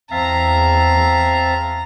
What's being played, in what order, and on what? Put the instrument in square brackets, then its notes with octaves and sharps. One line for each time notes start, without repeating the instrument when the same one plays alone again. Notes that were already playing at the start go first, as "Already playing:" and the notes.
[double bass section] E2 [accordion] C4 [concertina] E5 F5 A5 [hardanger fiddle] A#5